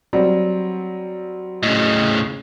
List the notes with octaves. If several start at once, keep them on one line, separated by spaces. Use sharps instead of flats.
F#3 G3 C4
A2 C#3 D#5